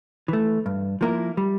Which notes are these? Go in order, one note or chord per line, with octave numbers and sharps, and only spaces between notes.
E3 A3
G2
F3 A#3 E4 A#4
G3